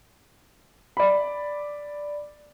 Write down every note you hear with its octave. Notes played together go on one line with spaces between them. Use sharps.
D5 B5